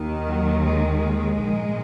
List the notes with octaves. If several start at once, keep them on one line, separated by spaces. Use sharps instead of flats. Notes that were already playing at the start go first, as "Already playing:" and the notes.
Already playing: D#2 D#3
F#3
G#3
A#1 G#2 D#3